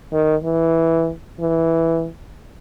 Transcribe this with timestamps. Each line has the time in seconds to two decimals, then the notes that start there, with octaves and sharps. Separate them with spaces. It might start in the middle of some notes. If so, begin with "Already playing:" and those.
0.13 D#3
0.44 E3
1.41 E3